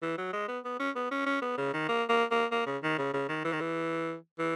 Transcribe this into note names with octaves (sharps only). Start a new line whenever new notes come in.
E3
F#3
G#3
B3
B3
C#4
B3
C#4
C#4
B3
C#3
D#3
A#3
A#3
A#3
A#3
C#3
D#3
C#3
C#3
D#3
E3
D#3
E3
E3